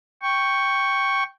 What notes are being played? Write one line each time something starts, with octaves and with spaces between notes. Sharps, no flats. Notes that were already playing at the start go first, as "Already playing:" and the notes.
G5 C#6